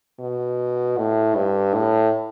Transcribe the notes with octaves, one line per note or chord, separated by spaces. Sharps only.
B2
A2
G2
A2